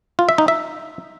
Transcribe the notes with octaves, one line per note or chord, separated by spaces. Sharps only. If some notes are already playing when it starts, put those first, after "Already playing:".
F4
E5
D#4
E5